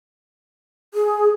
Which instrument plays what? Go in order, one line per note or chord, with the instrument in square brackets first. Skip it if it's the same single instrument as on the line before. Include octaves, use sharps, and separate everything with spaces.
[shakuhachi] G#4